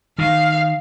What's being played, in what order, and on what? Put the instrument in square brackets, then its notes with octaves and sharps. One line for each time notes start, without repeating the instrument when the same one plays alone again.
[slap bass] D#3 [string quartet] F5